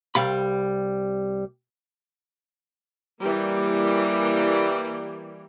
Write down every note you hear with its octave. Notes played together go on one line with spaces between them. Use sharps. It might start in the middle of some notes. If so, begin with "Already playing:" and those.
C2 G3 F5 B5
E3 G3 A#3